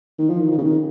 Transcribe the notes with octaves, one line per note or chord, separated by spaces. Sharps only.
D#3
F3
D#3
D#3
C#3
D#3